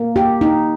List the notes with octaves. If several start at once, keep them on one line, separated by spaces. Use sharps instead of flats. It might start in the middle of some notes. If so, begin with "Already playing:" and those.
Already playing: A#3
G4
D#4